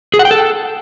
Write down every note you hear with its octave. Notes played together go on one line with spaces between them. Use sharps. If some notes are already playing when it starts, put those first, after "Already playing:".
G#4
F#5
G5
A4